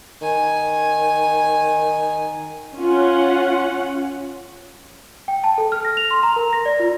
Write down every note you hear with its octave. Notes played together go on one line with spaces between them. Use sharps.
D#3 G#5
C#4 F4 F#5
G5
A5
A4
F6
A#6
F7
C6
A#5
A#4
A#6
D5
F4